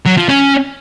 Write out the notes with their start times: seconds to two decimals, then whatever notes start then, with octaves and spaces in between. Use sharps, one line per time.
0.06 F#3
0.17 F3
0.29 C#4